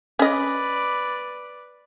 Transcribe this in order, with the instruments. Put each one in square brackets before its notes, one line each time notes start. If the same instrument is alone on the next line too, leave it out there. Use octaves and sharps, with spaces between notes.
[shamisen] C#4 D#5 [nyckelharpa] B4 D5